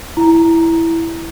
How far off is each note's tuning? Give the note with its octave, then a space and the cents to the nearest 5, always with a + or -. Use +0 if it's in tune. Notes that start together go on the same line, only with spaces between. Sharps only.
E4 +0 A#5 +0